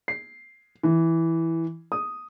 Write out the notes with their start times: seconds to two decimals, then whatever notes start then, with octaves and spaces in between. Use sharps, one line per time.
0.08 C7
0.83 E3
1.92 D#6